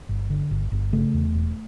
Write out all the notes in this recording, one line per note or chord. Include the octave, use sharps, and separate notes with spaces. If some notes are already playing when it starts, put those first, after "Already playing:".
G1
D3
G1
G1
C#3 A3
E2
E1